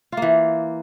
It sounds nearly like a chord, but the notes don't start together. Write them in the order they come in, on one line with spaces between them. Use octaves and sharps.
F4 A#3 E3